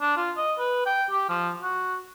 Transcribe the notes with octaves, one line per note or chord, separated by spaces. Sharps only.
D4
F4
D#5
B4
G5
G4
F3
F#4